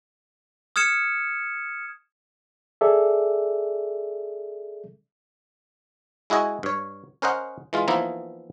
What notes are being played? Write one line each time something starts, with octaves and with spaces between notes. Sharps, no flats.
D#6 F6 G#6 C#7 E7
G#4 A4 D5 E5
G#3 E4 F#4 D#5 G#5
G2 C#5
C#4 A#4 C5 D#5 F#5
E3 G#3 F4
E3 F3 A#3 B3 D#4 E4